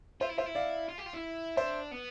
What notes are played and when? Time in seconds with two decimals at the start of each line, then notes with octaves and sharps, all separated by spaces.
0.21 F4 C5 E5
0.30 E4
0.38 F4 C5 E5
0.47 E4
0.55 D5 F5
0.89 F4
0.98 G4
1.06 F4
1.14 E4
1.57 D4 C5 E5
1.91 B3